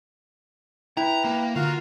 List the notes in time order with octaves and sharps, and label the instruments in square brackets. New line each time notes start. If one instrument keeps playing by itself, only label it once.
[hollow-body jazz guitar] E4 [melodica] B4 [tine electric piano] G5 [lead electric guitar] A#5
[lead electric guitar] A#3
[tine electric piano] D3 [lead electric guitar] F4 [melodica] F#4 A#4 F5